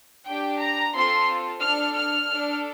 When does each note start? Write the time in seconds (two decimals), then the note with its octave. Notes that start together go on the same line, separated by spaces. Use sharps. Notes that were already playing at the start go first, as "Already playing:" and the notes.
0.28 D4 G4 G5
0.61 A#5
0.94 C4 F4 A4 C6
1.61 D4 A4 F6
1.94 F6
2.27 D4 A4